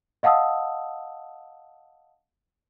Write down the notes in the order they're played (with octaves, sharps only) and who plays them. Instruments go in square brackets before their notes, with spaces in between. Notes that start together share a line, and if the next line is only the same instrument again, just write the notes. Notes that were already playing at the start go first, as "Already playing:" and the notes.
[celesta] D#5 F5 F#5 A5 D#6 E6